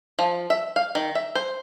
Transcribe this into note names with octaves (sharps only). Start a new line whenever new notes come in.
F3
E5
F5
D#3
E5
C5